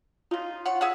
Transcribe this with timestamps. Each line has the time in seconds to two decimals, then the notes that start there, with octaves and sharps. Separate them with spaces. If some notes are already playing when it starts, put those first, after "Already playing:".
0.31 C#3 D#4 F4
0.65 C#5 F#5
0.81 G#4 E5 F#5